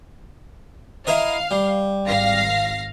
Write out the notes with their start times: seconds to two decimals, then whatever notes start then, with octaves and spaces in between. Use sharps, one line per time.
1.07 E4 A#4 D#5 F5
1.51 G3
2.05 G#1 F5 A#6